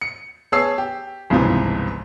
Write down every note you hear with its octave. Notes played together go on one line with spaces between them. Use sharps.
C#7
B3 G#4 C#5 A5 E6 C7
G4
G1 C#2 G#2 C3 E3 F3